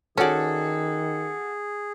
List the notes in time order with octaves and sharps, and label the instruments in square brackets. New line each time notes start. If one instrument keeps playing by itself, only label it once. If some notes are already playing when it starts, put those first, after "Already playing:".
[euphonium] D#3 [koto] C#4 D5 [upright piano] F#4 A4 [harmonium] G#4